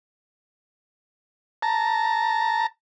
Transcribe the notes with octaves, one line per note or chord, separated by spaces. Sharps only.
A5 A#5